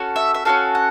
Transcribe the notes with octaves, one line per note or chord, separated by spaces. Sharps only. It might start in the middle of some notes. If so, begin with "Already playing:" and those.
Already playing: C#4 F#4 A4
E5
E5
C#4 F#4 A4 F5
F#5